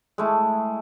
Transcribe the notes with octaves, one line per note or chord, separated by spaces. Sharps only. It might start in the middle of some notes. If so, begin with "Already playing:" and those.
G#3 A3 E4